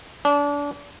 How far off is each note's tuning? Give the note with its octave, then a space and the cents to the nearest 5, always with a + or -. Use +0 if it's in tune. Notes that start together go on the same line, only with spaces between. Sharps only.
D4 -30